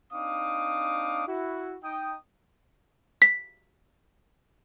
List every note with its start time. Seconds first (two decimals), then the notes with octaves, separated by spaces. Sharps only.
0.12 C4 D4 D#4 F5 D6 D#6
1.26 E4 F#4
1.82 D#4 G5 D#6
3.22 B6